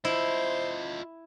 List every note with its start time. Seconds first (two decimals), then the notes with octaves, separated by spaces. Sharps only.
0.05 E4 F4 C5 D#5